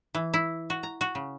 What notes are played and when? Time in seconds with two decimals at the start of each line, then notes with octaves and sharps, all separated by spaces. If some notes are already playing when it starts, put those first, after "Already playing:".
0.15 E3
0.34 E4
0.70 F#4
0.83 A#5
1.01 F#4
1.15 C#3